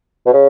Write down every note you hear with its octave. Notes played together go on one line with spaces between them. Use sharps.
B2
C#3